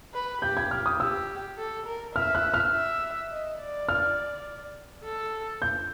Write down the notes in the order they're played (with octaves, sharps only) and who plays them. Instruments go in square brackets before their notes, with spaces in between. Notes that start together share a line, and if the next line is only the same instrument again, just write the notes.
[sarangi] B4
[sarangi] G4 [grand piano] G6
[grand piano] G#6
F6
D#6
[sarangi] G4 [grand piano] E6
[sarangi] A4
A#4
[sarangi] E5 [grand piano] F6
[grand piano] F#6
F6
[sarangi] E5
D#5
D5
[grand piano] F6
[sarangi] A4
[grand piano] G6